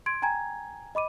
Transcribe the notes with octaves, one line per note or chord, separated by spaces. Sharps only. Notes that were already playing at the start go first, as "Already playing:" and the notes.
C6 G#6 D7
G5 G#5 A#5 G#6
D#5 B5 D6 D#7